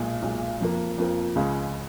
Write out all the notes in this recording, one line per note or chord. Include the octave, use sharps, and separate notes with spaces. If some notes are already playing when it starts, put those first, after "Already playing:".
Already playing: B1 A#2 G#3
B1 A#2 G#3
F2 F3 A#3
F2 F3 A#3
C#2 C#3 G#3